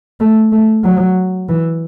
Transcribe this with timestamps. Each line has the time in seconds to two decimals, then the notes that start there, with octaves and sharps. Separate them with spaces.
0.20 A3
0.52 A3
0.84 F#3
1.49 E3